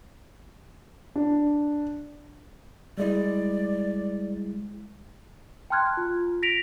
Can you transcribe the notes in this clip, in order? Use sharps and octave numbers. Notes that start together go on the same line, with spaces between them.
D4
G3 G#3 E4 D5
G5 A5 C6 F6 F#6 G#6
F4
A#6 B6 D7 F7